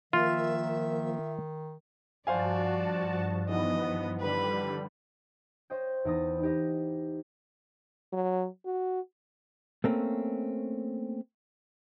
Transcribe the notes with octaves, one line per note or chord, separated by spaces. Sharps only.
D#3 F3 A#3 F4 E5
G2 F3 F#4 C5 D5 F5 G#5 A5
D#3 E3 B3 D#5
D3 G3 B4 B5
C5 C#5 D#5 G5
E2 E3 D#4 D#5 D#6 A6
D#4 G4 D#5
F#3
F#4
A3 A#3 C4 C#4